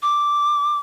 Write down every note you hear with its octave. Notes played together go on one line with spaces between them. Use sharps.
D6